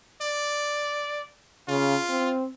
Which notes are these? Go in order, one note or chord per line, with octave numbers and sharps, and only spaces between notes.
D5
C#3 F4
C4